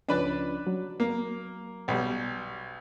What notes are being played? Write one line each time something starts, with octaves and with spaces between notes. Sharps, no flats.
C#2 F3 C#4 D4 B4 D5
F#3
A#3
B1 G3